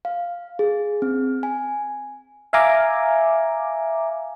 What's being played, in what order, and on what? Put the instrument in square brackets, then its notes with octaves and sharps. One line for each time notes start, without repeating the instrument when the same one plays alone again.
[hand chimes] F5
G#4
C4
G#5
[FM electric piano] E5 F5 G#5 A#5 D6